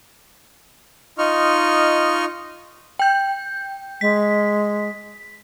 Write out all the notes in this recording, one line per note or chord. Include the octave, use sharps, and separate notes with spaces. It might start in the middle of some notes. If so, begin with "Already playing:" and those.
D#4 F4 D#5 C#6 F6
G5 G6
G#3 B6